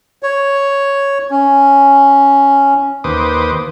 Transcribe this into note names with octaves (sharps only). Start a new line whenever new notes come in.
C#5
C#4
D#2 B4 C5 D6 D#6